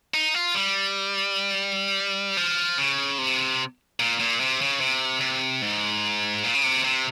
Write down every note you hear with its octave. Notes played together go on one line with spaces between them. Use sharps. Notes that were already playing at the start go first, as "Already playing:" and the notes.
D#4
F4
G3
F3
C#3
C3
A#2
A#2
C3
C#3
C3
C3
G#2
A#2
C#3
C3
C3